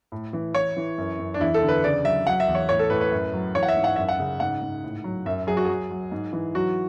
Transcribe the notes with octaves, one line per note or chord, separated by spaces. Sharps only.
A2
E3
E3 C#5
E3
F#2
F#2
D4
E2 E4
A4
D3
B4
C#3 D5
F#3 E5
F#3 F#5
E5
E2
C#5
A2 C#5
A4
A2 B4
B4
F#2
F#3
E3 C#5
F#5
E5
G#2
F#5
F#2 E5
F#5
C#3
G#2 F#5
G#2
A2
F#3
F#2 E5
F#3 G#4
F#4
F#3 G#4
F#3
G#2
E3
F#3 F#4